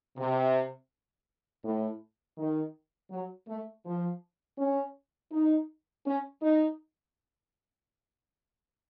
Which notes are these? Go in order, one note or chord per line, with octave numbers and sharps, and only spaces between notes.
C3
A2
D#3
F#3
A3
F3
C#4
D#4
C#4
D#4